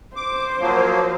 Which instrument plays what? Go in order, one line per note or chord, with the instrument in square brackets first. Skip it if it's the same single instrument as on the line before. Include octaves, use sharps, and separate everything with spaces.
[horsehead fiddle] C5 [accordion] D6
[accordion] F3 F#3 A#3